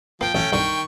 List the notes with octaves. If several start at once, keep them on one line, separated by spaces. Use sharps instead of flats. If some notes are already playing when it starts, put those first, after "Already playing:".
F3 A#3 G5
A1 A3 C#4
C2 D3 D#3 C#6